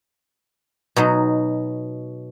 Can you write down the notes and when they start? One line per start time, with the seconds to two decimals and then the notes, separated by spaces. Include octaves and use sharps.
0.96 B2 F#3 D#4